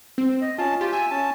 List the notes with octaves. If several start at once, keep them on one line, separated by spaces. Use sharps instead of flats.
C4
D#5
C#4 F4 A5
F4 G4
E5 G#5
C#4 A5